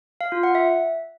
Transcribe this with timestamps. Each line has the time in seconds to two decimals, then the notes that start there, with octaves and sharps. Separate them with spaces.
0.21 F5
0.32 F4
0.43 F#5
0.55 E5